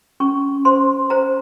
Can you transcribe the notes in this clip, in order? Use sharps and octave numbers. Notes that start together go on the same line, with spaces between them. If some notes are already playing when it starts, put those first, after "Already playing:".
C#4 C#6
C5 C6
C5 A#5